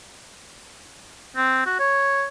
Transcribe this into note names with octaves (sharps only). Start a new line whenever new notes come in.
C4
F#4
C#5